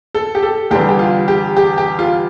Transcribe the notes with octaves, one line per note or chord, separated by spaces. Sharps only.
A4
G4
A4
E2 D3 G3 G4
G4
F4
G4
G4
G4
F4